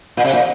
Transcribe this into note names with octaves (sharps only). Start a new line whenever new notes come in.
A#2
C3
A#2